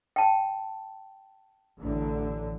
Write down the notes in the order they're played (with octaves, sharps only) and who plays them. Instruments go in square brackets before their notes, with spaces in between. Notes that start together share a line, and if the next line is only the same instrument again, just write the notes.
[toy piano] G5 A5
[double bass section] A1 D3